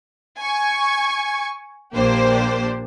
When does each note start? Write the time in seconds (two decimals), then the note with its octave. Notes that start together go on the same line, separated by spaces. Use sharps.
0.40 G#5 C#6 G#6
1.94 A#1 A#3 D4 G4 C5